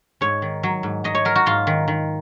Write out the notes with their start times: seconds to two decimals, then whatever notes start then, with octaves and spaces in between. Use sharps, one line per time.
0.21 G#2 C#5
0.42 D#3
0.63 F#3
0.83 G#2
1.04 F#3 D#5
1.15 C#5
1.25 F#3 A#4
1.35 F#4
1.46 G#2 F4
1.67 D#3
1.88 D#3